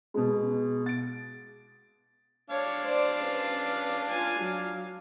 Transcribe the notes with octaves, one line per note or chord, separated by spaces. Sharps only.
B2 G#3
A6 D7
D4 C#5 F5
C5 D5
C#4 B4
F4 G#5
F#3